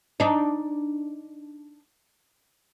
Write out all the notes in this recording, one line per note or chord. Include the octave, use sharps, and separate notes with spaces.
D4 D#4